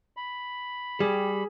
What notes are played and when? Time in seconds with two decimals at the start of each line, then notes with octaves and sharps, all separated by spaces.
0.17 B5
1.00 G3 G4 G#4